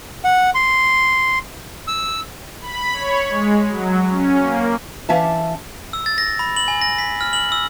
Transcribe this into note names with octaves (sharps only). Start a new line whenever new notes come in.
F#5
C6
E6
B5
C#5
G#3
F#3
C#4
A#3
E3 C#4 E5 F5 A5
E6
A6
A#6
B5
F#7
G#5
A#6
B6
F6
F#7
E6